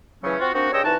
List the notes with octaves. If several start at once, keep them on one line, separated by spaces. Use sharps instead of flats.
C#3 E3 F#3 A3 C#4
C4 F4 F#4
A#3 C4 D4 D#4 F#4
G2 C#3 C#5 D#5 G5 E6
C2 E3 D#4 F#4 A5